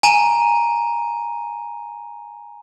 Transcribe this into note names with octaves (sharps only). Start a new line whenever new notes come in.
G#5 A#5 D#7